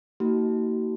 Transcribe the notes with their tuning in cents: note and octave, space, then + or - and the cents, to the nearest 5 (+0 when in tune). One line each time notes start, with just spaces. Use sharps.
A#3 -35 D#4 +40 F#4 +40